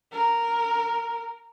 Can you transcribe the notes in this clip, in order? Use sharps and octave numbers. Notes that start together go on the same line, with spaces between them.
A#4